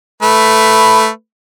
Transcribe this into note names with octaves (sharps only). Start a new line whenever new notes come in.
A3 B4